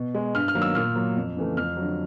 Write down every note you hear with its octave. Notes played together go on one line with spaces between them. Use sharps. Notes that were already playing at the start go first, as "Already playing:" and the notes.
Already playing: B2
G#3
G2 F6
F6
D#3 F#3 A#3
E6
A#2 F6
F#3 A#3
F2
C#3 E3 A3
F2 F6
D3 F#3